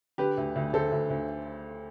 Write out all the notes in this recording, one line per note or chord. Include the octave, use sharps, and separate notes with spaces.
D3 G4 B4
D2
D2
D2 A4 C5
D2
D2